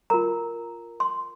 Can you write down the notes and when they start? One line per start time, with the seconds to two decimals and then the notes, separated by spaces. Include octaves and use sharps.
0.10 F4 A#4 A#5
1.00 C6